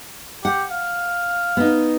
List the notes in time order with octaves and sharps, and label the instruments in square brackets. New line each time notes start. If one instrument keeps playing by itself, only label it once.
[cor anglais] G4 [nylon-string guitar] F#5
[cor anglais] F5
[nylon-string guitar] B3 D#4